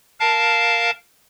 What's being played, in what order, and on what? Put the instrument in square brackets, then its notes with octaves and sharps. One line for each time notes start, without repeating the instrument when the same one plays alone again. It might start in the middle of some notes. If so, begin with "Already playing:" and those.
[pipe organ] A#4 F5 A5